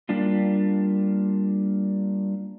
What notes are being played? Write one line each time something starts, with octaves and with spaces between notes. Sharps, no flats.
G3 A#3 D4 F4